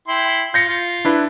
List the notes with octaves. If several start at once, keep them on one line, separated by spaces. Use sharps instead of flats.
E4 G5 C6
F4 G6 A#6 C#7
F4
D4 E4 B4